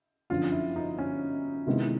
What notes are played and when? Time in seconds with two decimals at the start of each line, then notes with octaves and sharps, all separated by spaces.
0.30 G1 F#2 D3 F3 F4
0.52 E4
0.76 D#4
0.98 C#4
1.67 C3 D#3 G#3 B3 E4